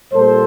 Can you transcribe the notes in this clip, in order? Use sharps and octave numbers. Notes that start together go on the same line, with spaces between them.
A#2 G3 A#3 A4 C5